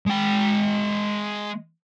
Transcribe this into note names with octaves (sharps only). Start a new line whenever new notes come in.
G#3 G5